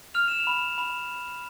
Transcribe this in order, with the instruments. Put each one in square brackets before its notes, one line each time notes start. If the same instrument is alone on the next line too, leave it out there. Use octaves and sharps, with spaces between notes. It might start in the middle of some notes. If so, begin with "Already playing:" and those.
[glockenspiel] F6 F7
E7
F7
B5
B5